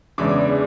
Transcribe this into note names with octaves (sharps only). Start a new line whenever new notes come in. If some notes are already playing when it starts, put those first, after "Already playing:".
E2 C#3 E3 G#3 D4 D6